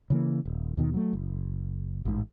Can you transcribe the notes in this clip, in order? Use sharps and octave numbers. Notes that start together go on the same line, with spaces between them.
C#3 E3 A#3
D#1
D#2 B2 D#3
F#3 A3
F#1
A1 G#2